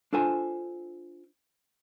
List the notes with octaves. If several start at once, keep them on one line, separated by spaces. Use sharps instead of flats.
D4 F4 A4 C5 G#5